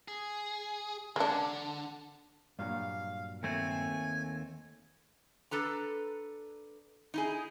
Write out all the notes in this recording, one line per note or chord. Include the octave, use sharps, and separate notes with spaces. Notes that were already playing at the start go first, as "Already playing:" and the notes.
G#4
D3 G#3 D4
G2 A#2 F#3 F5
D#2 A3 C4 G#5
D4 A4 B4 A#5
D#4 E4 G#4